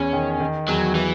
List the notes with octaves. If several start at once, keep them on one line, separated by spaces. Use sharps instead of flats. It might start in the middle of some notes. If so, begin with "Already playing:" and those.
Already playing: E2 C#4
D#3
D#3
E2 F#3
E3 F#3